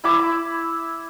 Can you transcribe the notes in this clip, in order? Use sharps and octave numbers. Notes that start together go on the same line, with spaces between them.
E4 B5 D6 E6